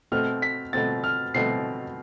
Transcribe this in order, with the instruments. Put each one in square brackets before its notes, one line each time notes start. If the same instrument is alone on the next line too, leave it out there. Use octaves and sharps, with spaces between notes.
[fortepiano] B2 A3 C4 [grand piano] F6
[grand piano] B6
[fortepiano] B2 A3 C4 [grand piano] A6
[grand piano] F6
[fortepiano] B2 A3 C4 [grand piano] C7